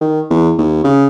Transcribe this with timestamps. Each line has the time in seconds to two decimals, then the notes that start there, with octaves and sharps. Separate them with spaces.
0.01 D#3
0.30 E2
0.58 D#2
0.84 C#3